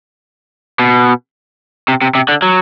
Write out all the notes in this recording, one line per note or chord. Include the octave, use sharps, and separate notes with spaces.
B2
C3
C3
C3
D3
F#3